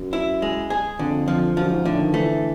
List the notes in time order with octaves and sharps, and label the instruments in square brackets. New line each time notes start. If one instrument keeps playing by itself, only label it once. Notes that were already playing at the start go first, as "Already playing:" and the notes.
Already playing: [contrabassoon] F#2
[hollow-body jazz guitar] E4
G#3
G#4
[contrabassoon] F2 [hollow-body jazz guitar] D3
[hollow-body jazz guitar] F3
[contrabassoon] F#2 [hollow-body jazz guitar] F3
[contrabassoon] G#2
[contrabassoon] A2 [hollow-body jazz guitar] D3
[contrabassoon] D#3
[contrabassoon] E3 [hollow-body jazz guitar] A3